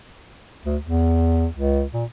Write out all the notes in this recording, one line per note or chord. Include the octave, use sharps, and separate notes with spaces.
D2
E2
C#2
A#2